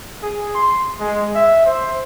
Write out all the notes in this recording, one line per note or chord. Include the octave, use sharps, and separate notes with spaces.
G#4
C6
G#3
E5
C5